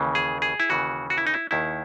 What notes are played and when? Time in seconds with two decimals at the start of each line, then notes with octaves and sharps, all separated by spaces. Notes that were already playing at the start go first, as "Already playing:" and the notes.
Already playing: D#2 C#3 E3
0.15 G#4
0.42 G#4
0.60 E4
0.70 D#2 C#3 E3 F#4
1.10 F#4
1.18 E4
1.27 D#4
1.34 E4
1.51 D#2 D#3 E4